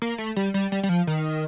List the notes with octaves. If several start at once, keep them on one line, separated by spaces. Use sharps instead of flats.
A#3
A3
G3
G3
G3
G3
F3
D#3